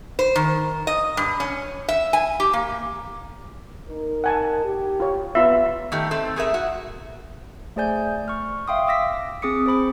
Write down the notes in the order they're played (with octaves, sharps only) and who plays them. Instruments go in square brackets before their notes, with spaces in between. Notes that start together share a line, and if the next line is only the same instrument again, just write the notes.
[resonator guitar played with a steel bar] C5
D#3
D#5
G2
C#4
E5
G#5
G4
A#3
[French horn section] D#4 A#4
[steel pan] F#5 G#5 A5
[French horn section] G4
[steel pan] F4 C#5
[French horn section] B3 [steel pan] F4 E5
[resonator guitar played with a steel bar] D#3 A3 G4
A3 C4 A4
A3 G#4 A#4 E5
F#4
[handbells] A3 G#4 C5 D5 G#5 G6
C#6 F6
E5 F5 G5 C6 D#6
D6 E6 A#6 B6
C4 G#4 D6 D#6 C#7
G#4 C5 B5 D6